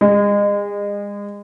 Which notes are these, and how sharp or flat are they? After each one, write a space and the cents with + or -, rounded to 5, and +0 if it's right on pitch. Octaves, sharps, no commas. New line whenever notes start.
G#3 -35